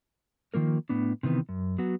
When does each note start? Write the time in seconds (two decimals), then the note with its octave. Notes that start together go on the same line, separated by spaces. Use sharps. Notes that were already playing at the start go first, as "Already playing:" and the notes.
0.54 D#3 F3 A#3 A#4
0.89 A2 B3 D4
1.23 C3 D#3 E3 B3
1.49 F#2
1.78 F#3 B3 F#4